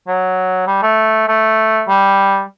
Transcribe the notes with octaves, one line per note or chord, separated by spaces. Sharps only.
F#3
G3
A3
A3
G3